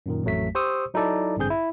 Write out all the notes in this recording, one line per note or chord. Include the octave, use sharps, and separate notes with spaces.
F#2 A#2 D#3
A1 F2 F#3 A3 B6
G4 C5 C#6 D#6 E6
F#3 D#4 E4 A4 D5
A1 G2 D3 C4 G#4 G6
E4